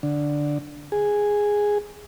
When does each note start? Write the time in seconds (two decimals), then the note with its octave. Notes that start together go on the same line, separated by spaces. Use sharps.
0.03 D3
0.92 G#4